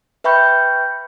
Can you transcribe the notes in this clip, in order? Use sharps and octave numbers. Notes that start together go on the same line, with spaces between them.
B4 E5 G5 B5 C#6 G6